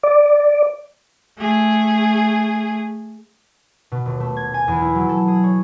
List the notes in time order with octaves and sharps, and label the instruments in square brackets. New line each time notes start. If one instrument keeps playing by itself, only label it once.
[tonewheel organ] D5
[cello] A3 G#4
[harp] B2
D#1
A3
G#6
G#5
E2
E4
F#3
A4
G#4
C#5